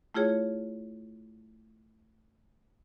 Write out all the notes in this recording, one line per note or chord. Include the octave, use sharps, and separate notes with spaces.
A3 E4 F4 G#4 C#5